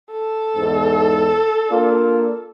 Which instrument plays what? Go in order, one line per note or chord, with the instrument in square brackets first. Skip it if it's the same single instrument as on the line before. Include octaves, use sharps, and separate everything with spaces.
[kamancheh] A4
[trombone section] E2 G#2
A#3 D4 F4